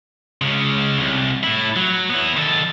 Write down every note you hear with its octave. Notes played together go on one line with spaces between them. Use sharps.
C#2 C#3
C2
A2 E4
F#3
B3 E4
D#3 A4